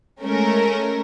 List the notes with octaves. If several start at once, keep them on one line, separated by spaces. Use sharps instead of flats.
G#3 A3 C#4 A#4